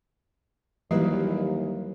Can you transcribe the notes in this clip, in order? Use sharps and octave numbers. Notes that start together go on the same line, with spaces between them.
D#2 E3 F#3 G3 A#3 E4 B4